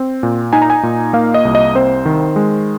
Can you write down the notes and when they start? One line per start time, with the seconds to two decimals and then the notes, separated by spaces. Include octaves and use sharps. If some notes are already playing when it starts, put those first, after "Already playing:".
Already playing: C4
0.23 A#2
0.53 D#4 G#5
0.62 A#5
0.70 G#5
0.83 A#2
1.13 A#3 F5
1.34 D#5
1.45 C2
1.55 D#5
1.75 C4 C5
2.05 D#3
2.36 G#3